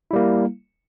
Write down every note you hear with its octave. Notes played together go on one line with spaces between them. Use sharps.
G3 A#3 E4